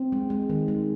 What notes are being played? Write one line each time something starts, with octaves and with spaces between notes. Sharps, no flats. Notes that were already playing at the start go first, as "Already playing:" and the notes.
Already playing: C4
G#3
G#3
D#3
G#3